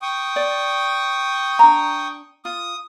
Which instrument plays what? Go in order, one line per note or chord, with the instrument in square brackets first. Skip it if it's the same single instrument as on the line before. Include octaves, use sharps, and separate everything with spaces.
[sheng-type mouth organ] G5 C#6 D#6
[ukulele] D5
D4 A#5
[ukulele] F4 [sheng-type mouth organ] D#6